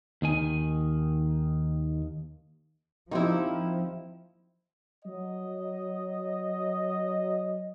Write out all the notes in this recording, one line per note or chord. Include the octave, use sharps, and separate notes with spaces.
D#2 D#3 G#5
F3 A#3 C4 D#4 E4 G4
F#3 D#5